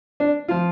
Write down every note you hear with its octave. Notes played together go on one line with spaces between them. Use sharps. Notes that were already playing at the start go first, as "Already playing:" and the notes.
D4
F3 F4